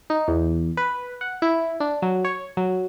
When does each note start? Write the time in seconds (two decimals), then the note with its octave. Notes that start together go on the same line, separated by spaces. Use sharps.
0.10 D#4
0.28 E2
0.77 B4
1.21 F#5
1.42 E4
1.80 D4
2.02 F#3
2.25 C#5
2.57 F#3